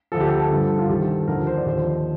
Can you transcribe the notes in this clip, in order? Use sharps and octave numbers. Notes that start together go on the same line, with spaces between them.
D2 D3 F3 A4
G4
A4
G2 D3 F3
F4
C2 C3 D#3 G4
A4
D#2 D3 F3 A#4
C5
D5
D#2 D3 F3 C5